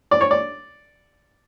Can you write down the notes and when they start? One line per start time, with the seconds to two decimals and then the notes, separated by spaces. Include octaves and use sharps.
0.11 D5
0.21 C#5
0.31 D5